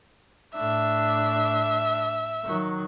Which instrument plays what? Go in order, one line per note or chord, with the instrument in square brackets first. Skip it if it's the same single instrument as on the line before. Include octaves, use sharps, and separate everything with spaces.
[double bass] A2 D4 [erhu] E5
[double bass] D#3 F#3